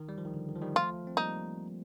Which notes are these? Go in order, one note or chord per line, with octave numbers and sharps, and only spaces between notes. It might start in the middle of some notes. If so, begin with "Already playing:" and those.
Already playing: D#3
G3
F3
D#3
D3
D#3
F3
D#3 G3
F3 A3 F4
C4
G3 A#3 D#4